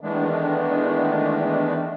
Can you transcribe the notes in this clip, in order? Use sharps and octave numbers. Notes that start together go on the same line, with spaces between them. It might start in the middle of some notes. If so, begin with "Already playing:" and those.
D#3 E3 G#3 A3 B3 D4